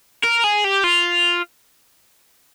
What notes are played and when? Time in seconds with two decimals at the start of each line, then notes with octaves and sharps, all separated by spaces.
0.24 A#4
0.44 G#4
0.64 G4
0.84 F4